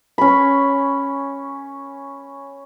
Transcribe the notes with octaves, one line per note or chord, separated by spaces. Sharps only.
C#4 B5